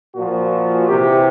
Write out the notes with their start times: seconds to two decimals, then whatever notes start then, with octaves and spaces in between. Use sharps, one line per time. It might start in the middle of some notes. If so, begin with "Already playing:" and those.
0.15 A#2 F3 F#4
0.87 C3 E3 G4